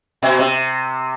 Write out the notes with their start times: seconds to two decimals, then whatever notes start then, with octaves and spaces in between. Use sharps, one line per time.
0.23 B2
0.39 C3